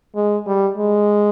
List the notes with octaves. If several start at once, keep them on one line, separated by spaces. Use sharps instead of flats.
G#3
G3
G#3